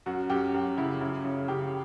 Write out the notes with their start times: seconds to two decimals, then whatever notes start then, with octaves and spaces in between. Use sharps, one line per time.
0.06 F#2 F#4
0.30 F#2 G4
0.54 F#2 F#4
0.78 C#3 E4
1.01 F#2 E4
1.24 C#3
1.48 C#3 G4